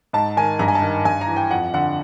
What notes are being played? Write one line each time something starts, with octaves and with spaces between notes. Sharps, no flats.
G#2 A5
D#3 G#5
G2 A#5
G#5
A5
D#3
G2 G#5
A#5
E3
G5
F2 F#5
D3 F#5